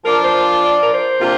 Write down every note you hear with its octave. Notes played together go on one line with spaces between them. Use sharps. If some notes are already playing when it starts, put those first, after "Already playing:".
F3 D4 F4 A#4
C5
D5
A#4
C5
C3 A#3 D4 F4